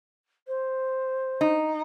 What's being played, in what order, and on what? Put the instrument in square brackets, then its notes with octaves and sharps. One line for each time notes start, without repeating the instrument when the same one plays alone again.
[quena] C5
[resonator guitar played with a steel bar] D#4